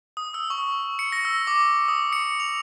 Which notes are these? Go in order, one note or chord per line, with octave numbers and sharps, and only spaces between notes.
D#6
E6
C#6
C#7
A#6
E6
D6
D#6
C#7
F7